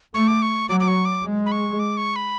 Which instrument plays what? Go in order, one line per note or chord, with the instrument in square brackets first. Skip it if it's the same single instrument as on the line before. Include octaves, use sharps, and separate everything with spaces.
[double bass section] A3 [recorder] C#6
[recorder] D6
C#6
[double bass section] F#3 [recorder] D6
[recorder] D6
C#6
D6
[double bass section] G#3
[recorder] B5
C#6
D6
C#6
B5